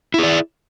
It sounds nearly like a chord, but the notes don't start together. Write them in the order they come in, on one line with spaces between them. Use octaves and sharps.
E4 G#4 D5